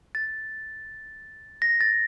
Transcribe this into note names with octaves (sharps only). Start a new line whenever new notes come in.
A6
A#6
A6